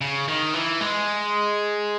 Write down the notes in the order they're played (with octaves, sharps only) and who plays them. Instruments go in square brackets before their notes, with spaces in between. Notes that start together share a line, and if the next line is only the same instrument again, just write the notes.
[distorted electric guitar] C#3
D#3
E3
G#3